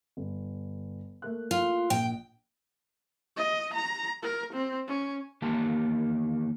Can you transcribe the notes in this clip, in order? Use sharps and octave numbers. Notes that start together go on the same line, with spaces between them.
G1
A3 A#3 F#6
F4
A#1 G5
D#5
A#5
A#4
C4
C#4
E2 D#3 A#3 G4 G#5 A5